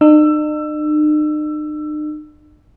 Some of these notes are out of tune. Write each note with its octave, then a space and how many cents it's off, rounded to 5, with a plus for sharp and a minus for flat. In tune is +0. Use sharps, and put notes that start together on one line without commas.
D#4 -45 E6 +20